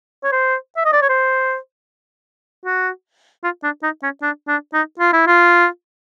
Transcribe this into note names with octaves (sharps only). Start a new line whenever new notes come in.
C#5
C5
E5
D#5
D5
C#5
C5
F#4
F4
D4
D#4
C#4
D4
D4
D#4
F4
E4
F4